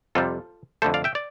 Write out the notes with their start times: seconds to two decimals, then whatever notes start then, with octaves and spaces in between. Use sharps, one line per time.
0.15 F2 C3 G3 F4 A4
0.82 F2 D3 A3 A4 C5
0.94 D5 F5
1.04 E5 G5
1.15 D5